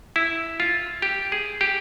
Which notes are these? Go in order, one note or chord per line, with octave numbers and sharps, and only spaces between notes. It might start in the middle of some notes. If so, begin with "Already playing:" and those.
E4
F4
G4
G#4
G4